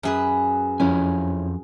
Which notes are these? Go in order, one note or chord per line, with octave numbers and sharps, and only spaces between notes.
F#2 G#4 B4
F2 C#4 E4 G#5